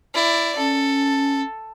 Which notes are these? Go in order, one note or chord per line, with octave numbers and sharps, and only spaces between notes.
E4 D5
C#4 A4